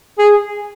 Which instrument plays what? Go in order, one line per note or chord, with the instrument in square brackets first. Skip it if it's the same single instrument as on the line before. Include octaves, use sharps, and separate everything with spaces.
[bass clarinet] G#4